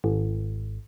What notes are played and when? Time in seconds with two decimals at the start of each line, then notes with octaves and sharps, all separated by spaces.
0.04 G#1